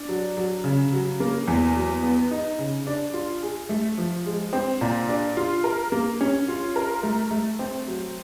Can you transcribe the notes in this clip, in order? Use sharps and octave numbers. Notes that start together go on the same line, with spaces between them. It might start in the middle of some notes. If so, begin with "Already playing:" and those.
Already playing: D4
F#3
F#3
C#3
F#3
A#3
E2
F#3
B3
D#4
C#3
D4
F4
G#4
A3
F3
G#3
C4
A#2
D4
F4
A#4
A#3
C#4
F4
A#4
A3
A3
C4
F#3